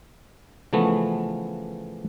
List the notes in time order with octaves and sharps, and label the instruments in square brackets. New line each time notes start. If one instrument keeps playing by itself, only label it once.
[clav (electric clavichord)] C#3 E3 F3 A3 B3